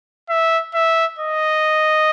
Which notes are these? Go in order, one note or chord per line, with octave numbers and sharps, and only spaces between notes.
E5
E5
D#5